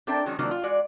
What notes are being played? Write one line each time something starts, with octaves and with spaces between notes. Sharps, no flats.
C4 D4 A4 A#4 E5 G5
D#3 F#3 G#3 C#4 D#4
D#3 F3 F#3 A#3 C4 D4
F4
E3 G#3 F#4 D5